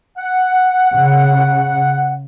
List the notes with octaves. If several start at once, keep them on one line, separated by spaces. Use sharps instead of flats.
F#5
C#3